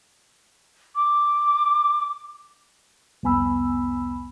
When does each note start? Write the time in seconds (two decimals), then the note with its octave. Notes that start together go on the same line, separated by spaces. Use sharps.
0.95 D6
3.23 C2 F2 B3 G#5 B5 E6